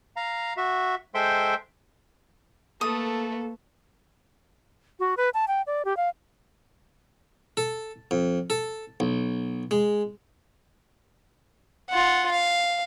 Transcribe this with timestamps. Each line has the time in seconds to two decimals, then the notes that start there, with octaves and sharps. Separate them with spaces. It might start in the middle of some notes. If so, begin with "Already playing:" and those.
0.16 F5 A#5
0.57 F#4 E5
1.15 G#3 A4 C5 E5 G5 C6
2.81 A3 A#3 A4 B4 D#6
5.00 F#4
5.17 B4
5.34 A5
5.48 G5
5.67 D5
5.85 G4
5.97 F5
7.57 A4
8.11 F2
8.50 A4
9.00 B1
9.71 G#3
11.90 F4 F#5
12.32 F5